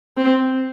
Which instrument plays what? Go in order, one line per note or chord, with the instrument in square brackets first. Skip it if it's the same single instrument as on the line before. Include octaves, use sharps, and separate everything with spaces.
[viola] C4